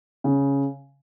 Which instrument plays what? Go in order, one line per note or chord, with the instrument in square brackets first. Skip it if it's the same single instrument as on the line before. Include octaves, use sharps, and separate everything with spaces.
[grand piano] C#3